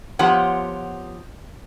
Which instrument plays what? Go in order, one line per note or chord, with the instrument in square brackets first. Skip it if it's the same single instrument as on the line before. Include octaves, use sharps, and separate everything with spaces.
[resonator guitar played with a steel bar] F3 B3 F4 G4 C#5 F#5